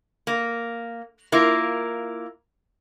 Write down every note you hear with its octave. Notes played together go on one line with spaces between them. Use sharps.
A#3
A#3 E4 F4 A#4